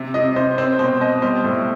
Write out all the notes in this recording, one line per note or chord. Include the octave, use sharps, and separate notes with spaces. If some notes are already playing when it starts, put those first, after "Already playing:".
Already playing: C3
C3 D#5
C3 C5
C4 C5
B2 C5
B2 D#5
G3 C5
A2